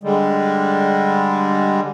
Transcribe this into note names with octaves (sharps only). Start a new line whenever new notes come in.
D3 G3 G#3